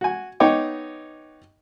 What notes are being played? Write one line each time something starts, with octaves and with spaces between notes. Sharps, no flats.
F#4 G#5
B3 D#4 C#5 D#5 G5 D6